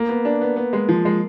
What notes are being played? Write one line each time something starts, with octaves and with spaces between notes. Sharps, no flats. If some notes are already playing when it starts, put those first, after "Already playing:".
Already playing: A#3
B3
D4
B3
B3
G#3
F3
G#3